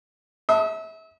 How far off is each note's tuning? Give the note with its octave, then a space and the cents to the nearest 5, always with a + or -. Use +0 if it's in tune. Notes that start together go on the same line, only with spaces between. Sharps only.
E5 -35 D#6 +30